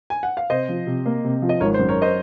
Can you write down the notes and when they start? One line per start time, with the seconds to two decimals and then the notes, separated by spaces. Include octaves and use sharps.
0.10 G#5
0.23 F#5
0.37 F5
0.50 C3 C5 D#5
0.69 F3
0.87 C3
1.06 A#3
1.24 C3
1.42 F3
1.49 D#5
1.60 G#1 A#4 C#5
1.74 C5
1.79 F#2
1.88 A#4 C#5
2.02 C5 D#5